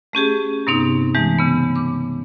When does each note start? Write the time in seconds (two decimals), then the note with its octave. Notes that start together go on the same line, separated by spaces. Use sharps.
0.13 A3 C#4 G4 G#4
0.67 G2 C3 B3 C4 D#4
1.15 E3 G#3 A3
1.39 C#3 B3
1.76 D6